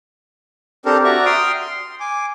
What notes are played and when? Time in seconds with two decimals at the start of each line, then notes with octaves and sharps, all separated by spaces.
0.86 C4 D4 G4 A4 A#4 C5
1.04 F#4 D5 E5 A#5 C#6
1.25 G5 C6 D#6 F6
1.61 C6
2.00 G#5 D6